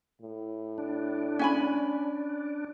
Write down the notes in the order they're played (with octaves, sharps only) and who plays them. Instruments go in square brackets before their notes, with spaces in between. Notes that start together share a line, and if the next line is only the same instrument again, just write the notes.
[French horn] A2
[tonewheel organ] D4
[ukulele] C#4 G#5 B5